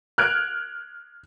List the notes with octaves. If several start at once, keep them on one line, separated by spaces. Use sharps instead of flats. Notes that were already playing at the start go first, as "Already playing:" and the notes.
F6 F#6 G#6 D7